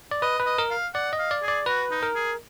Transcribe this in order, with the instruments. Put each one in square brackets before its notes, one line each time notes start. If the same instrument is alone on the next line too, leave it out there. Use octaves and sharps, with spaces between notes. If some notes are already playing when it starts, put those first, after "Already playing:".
[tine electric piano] D5
[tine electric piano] B4 [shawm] D#5
[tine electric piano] B4
[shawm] D#5
[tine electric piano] A#4
[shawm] F5
[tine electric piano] D5 [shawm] F#5
[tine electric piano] D#5
[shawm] F5
[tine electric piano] D5
[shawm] G#4
[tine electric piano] D5
[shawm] F#4 [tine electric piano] B4
[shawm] D#4
[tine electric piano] A#4
[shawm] G#4